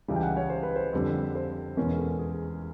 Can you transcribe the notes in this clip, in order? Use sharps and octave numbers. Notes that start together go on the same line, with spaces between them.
C#2 C#3 E3 G3
G5
F#5
C#5
C5
B4
C5
F2 D3 G3
C5
E2 B2 G#3 C#4 A#4
A4
G#4